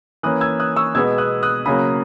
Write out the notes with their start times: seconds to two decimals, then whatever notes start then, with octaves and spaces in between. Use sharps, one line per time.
0.23 E3 A#3 C#4 D#6 F#6
0.41 E6 G#6
0.60 D#6 F#6
0.76 C#6 E6
0.95 B2 G#3 B3 E6 G#6
1.18 D#6 F#6
1.43 D#6 F#6
1.66 C#3 F#3 A#3 B5 D#6